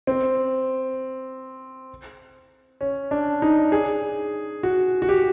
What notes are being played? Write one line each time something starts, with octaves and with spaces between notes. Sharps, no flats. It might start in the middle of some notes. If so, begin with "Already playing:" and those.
C4
C#4
D4
D#4
G#4
F#4
F#4
G4